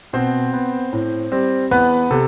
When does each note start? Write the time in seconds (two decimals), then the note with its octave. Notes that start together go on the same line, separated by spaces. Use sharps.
0.13 B2 C4 C5
0.53 B3
0.93 A2
1.32 G3 C4
1.71 E2 B3 B4
2.11 C3 A4